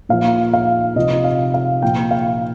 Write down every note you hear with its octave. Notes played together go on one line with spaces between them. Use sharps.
A#2 F3 F5
F5
C3 F3 D#5
F5
F5
A#2 F3 G5
F5